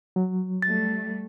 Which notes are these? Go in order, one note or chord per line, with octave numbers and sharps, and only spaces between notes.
F#3
G3 A3 A6